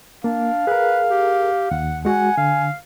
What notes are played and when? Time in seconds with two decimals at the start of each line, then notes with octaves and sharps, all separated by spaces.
0.24 A#3 D4 F5
0.67 G#4 A#4 B4
1.10 G4
1.71 D#2 F#5
2.05 G#3 F#4 F#5 G#5
2.37 D3 F5